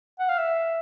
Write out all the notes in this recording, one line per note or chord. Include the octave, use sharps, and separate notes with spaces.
F#5
F5
E5